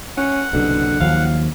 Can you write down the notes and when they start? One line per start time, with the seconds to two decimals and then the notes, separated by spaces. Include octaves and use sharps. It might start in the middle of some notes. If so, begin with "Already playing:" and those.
0.17 C#4 F#5
0.53 F#1 C2 B2 D3
1.00 D#2 F3 F#3 F5